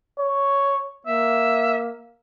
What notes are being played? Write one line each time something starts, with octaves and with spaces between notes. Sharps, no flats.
C#5
A#3 E5